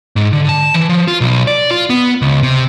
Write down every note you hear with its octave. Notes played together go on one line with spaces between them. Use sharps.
G#2
D3
A5
E3
F3
F4
B1
D5
F4
B3
C#2
C3